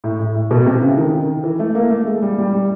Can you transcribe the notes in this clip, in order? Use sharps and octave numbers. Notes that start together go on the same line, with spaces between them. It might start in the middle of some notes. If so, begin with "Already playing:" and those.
A2
A2
A2
B2
C3
C#3
D#3
E3
A3
A#3
A3
G#3
G3
G3
G3